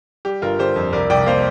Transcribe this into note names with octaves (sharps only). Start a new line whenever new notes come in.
G3 G4
G1 F4 A#4
D3 G4 C5
F2
C2 A#4 D5
C2 D5 G5
A#3 C5 F5